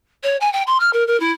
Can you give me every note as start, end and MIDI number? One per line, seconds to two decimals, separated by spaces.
0.23 0.36 73
0.40 0.51 80
0.53 0.63 79
0.67 0.77 84
0.80 0.90 89
0.93 1.06 70
1.07 1.19 70
1.20 1.31 64